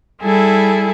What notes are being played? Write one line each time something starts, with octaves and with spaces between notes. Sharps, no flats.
G3 E4 G#4 A4